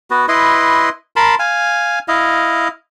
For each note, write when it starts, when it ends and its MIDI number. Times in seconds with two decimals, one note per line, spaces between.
0.10 0.26 59
0.10 0.26 66
0.28 0.89 64
0.28 0.89 71
0.28 0.89 75
0.28 0.89 84
1.16 1.35 70
1.16 1.35 81
1.16 1.35 83
1.16 1.35 84
1.39 1.99 77
1.39 1.99 80
2.08 2.68 64
2.08 2.68 75
2.08 2.68 77